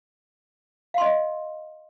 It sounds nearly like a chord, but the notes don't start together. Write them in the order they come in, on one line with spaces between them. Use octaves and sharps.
F5 C6 D#5